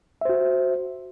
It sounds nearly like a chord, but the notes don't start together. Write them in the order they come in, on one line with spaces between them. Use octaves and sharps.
E5 C5 F#4